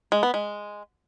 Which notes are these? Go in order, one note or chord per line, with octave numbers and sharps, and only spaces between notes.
G#3
B3
G#3